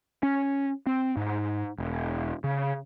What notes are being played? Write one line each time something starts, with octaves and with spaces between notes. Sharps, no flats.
C#4
C4
G#2
E1
C#3